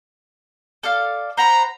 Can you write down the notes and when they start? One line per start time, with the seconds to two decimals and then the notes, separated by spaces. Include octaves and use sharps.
0.83 A4 D5 F5
1.37 C5 F#5 A#5 B5